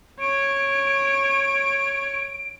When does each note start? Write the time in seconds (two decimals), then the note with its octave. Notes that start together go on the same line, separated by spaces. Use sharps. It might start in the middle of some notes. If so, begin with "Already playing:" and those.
0.20 C#5 D7